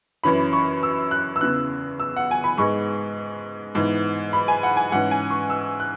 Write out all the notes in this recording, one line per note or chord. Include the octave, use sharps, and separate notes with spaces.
F#2 E3 C#4 B5
C#6
E6
F#6
E6
E2 C#3 E3 F#6
E6
F#5
G#5
B5
G#2 G#3 B3 C#6
G#2 E3 B3
B5
G#5
F#5
G#5
G#2 E3 C#4 F#5
G#5
C#6
E6
F#6